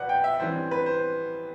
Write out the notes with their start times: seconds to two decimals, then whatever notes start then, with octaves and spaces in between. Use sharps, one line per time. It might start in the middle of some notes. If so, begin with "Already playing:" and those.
Already playing: C2 B2 B4 D5 F#5
0.09 G5
0.24 E5
0.40 A1 G2 E3 G3 C4 C5
0.71 B4
0.86 C5